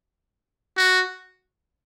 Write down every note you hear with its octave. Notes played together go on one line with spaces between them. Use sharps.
F#4